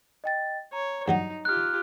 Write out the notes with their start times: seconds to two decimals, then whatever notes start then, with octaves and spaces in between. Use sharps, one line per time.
0.24 D#5 G5 A6
0.73 C#5 A#5
1.08 G2 F#3 D#4 F#4
1.45 F4 G4 F6 F#6